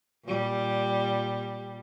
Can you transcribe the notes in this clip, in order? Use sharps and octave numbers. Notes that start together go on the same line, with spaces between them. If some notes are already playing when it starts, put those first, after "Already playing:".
A#2 G3